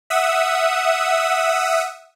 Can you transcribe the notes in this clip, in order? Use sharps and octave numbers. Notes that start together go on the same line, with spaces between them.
E5 F#5 D#6 E6